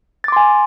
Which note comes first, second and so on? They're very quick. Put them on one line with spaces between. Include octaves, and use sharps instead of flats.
A6 D6 C6 G#5